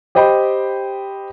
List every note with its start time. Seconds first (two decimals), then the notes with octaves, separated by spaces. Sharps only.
0.15 G4 C5 D#5 G5 B5